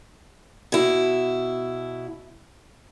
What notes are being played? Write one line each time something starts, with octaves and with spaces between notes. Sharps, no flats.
B2 E4